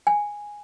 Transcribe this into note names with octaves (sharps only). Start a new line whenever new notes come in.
G#5